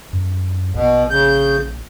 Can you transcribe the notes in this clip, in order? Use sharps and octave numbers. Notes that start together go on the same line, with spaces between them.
F#2
A#1 B2
C#3 G6